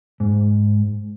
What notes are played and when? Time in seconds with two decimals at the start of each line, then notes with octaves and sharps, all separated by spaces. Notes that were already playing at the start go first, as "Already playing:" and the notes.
0.20 G#2